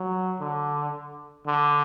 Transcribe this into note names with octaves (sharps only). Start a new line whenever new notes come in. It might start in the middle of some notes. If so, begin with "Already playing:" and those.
Already playing: F#3
D3
D3